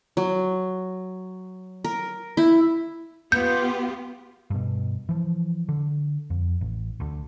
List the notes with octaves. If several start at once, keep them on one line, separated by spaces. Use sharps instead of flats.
F#3
A#4
E4
B3 F4 G4 G6
G2 B2
E3 F3
D3
F2
A1
D2 D3